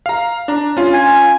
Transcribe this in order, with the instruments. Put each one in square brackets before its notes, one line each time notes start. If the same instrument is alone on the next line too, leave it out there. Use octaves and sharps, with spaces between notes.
[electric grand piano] F5 A#5
D4 A#5
C#4 F4
[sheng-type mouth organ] G#5